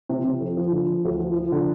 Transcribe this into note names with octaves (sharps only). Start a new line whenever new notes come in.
C3
C3
F2
F3
D3
F3
D2
F3
F3
D3